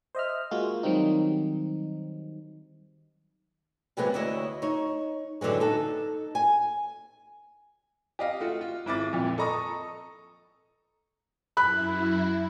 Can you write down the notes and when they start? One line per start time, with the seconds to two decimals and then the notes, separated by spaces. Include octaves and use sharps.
0.15 C5 D#5 E5 F6
0.51 G#3 A#3 F4 F#4
0.83 D#3 F#3 G3 C4 D#4
3.97 C3 E3 F#3 G#3 A#3 B3
4.14 D2 E4 C#5 D#5
4.62 D#4 C#5
5.41 G2 D3 E3 F#3 G#3
5.60 D#4 A4
6.35 G#5
8.19 G4 D#5 F5
8.40 A3 F4 F#4
8.61 F4
8.86 G#1 E4 D6 A6
9.12 A#1 F2 A#2
9.38 A4 D#5 A#5 C#6 D#6
11.57 F#2 E4 B5 F#6